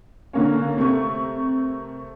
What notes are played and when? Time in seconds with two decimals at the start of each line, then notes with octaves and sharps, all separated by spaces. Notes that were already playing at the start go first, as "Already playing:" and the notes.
0.33 D3 A#3 C#4
0.77 C3 A3 A#4 C#6